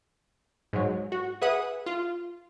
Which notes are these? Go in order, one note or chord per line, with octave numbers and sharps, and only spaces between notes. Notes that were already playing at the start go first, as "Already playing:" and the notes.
G#2 F#3
F#4
G#4 B4 E5 F#5 D#6
F4